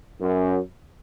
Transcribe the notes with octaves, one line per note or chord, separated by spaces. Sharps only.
F#2